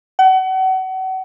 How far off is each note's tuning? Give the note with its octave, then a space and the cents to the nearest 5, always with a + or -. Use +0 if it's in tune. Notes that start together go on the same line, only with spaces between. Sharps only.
F#5 +35